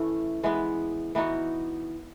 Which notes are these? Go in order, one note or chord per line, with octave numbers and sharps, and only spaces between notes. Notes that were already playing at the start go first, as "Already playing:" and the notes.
Already playing: E3 A3 C#4
E3 G#3 B3
E3 B3 D#4 F#4